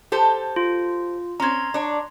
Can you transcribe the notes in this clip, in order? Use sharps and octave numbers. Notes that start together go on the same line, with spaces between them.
G4 A4 C5
F4
C4 C#4 A#5 C6 G#6
D4 C#5